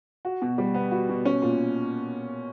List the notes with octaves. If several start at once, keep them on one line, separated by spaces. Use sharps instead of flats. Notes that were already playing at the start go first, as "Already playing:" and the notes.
F#4
B2
G3
B3
F#4
B2
C#4
A#2